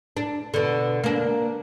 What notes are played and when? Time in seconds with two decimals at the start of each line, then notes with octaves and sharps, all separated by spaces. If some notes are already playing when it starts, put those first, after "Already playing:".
0.17 D4
0.54 B2 D3
1.04 A#3 D4